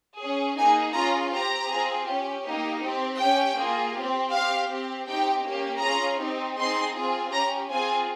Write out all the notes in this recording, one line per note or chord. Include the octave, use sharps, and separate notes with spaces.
C#4 G#4
A#3 D#4 G#4 G#5
C#4 F4 G#4 A#5
C4 G4 A#5
C4 F4 G#4
C#4 G4
A#3 D#4 G4
C4 G4
C#4 G4 G5
A#3 F4 G#4
C4 G4
C4 G4 F5
C4 G4
C4 D#4 G4 G5
A#3 C#4 G4
C#4 F4 G#4 A#5
C4 D#4 G4
C4 D#4 G#4 C6
C4 F4 G#4
C#4 G4 A#5
C4 F4 G#4 G#5